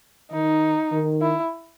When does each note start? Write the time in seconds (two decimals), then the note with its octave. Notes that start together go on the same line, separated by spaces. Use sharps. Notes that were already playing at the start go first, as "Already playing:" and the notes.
0.31 D#3 D#4
0.92 D#3
1.21 E4